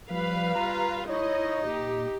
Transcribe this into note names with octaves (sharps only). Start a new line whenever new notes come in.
F3 G3 B4 F5
F4 A#5
D#4 E4 C#5 D#5
A#2 G4